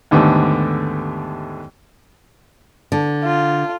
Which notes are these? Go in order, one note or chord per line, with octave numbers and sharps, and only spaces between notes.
D#2 G#2 D3 G3 A3 B3
D3
F4